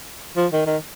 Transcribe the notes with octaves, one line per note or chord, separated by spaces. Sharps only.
F3
D#3
D#3